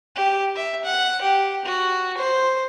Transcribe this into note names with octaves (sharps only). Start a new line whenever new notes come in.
G4
E5
F#5
G4
F#4
C5